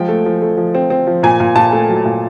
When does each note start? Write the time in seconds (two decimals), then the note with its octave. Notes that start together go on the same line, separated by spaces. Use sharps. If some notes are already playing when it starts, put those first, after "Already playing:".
Already playing: F3 G#3 G5
0.09 A3
0.26 F3
0.42 A3
0.57 F3
0.75 C4
0.90 C4
1.07 F3
1.23 A#2 G#5
1.40 A#2
1.55 A#2 A5
1.73 A3
1.89 F#3
2.05 A#2